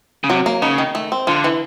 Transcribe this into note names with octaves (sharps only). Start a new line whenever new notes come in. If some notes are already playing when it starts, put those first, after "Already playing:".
C#3
C3 F#3
A#3
C#3 D#4
D#3
A3
C4
D3 F4
E3